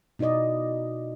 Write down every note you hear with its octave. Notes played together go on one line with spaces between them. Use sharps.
B2 D#4 E4 D5 D#5